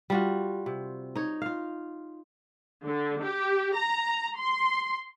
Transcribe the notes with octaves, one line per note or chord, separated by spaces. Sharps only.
G3 F4 F#4
C3
D#4 C#5
F4 F5
D3
G4
A#5
C6